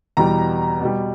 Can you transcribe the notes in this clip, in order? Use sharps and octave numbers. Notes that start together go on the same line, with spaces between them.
E2 B2 G3 A#5
B2 G3